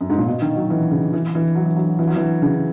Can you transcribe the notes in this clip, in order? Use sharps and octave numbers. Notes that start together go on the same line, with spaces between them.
F#2
G#2
A#2
B2
D#3
F#3
E3
C#3
E3
E3
F#3
E3
F#3
E3
F#3
E3
C#3